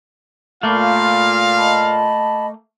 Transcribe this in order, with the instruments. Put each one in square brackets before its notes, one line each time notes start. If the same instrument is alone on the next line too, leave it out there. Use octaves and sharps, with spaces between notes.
[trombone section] A#2 F4 [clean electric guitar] A3 A#3 [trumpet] F5 [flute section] B5
[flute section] D#5 A5 B5